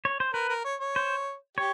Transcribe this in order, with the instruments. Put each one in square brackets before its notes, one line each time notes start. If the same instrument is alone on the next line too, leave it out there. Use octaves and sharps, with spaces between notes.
[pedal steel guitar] C#5
C5
[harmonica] A#4 [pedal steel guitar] B4
[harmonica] A#4
C#5
C#5
[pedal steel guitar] C5
[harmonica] G4 [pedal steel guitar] C#5